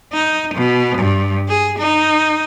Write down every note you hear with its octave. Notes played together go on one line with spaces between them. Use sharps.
D#4
B2
G2
G#4
D#4